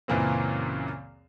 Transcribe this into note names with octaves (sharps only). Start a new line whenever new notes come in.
C#2 F#2 A#2 E3 A#3 C4